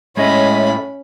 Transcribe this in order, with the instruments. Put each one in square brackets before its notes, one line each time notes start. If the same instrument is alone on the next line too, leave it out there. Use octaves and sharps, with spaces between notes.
[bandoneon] A2 [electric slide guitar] G#3 G#4 D#5 [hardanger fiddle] C#4 B5 [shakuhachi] E5